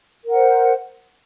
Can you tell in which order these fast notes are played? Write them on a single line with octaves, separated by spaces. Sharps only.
A#4 F#5 C5